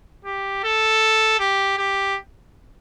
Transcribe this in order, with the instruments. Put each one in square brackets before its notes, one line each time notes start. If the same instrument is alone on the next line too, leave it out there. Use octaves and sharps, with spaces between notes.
[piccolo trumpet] G4
A4
G4
G4